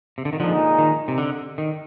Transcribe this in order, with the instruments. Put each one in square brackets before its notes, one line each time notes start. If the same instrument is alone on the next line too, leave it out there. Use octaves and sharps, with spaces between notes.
[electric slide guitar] C3
D3
D#3
[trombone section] A#2 G#3 D#4 [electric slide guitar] D3 F3
[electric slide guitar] D#3
C3
D3
D#3